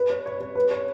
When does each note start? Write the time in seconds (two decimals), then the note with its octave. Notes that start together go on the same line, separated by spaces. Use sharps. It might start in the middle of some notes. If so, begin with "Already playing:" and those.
Already playing: B4
0.10 C#5
0.26 C#5
0.41 C#5
0.55 B4
0.71 C#5